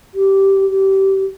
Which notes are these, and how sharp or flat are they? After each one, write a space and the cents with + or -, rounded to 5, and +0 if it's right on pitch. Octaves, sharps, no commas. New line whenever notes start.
G4 -10
G4 -25